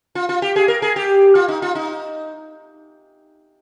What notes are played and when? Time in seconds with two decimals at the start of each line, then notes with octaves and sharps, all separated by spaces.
0.15 F4
0.29 F4
0.42 G4
0.56 G#4
0.68 A#4
0.82 G#4
0.96 G4
1.35 F4
1.48 D#4
1.62 F4
1.75 D#4